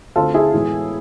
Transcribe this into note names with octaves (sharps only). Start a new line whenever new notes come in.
D2 D3 A3 C4 F4 A4
E4 G#4
A2 E3 G#3 B3